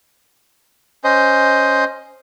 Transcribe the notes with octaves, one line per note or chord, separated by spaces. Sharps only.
C#4 C5 D#5